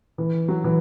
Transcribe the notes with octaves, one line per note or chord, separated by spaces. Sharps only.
E3
F#3
E3